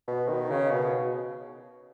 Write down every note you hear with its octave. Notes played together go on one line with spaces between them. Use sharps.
B2
D#3
C#3
B2